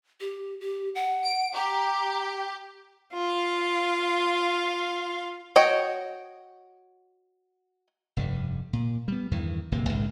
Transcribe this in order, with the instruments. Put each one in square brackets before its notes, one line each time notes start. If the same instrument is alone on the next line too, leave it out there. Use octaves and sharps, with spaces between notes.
[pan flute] G4
G4
F#5
[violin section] D7
[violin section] G4 [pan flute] A#5
[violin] F4 F5
[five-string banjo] F#4 C#5 D#5 G5
[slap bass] F1 G2 G3
A#2
G3 B3
E2 G2 D#3 E3
D1 G#1 C3 A#3
A#1 G#2 C#3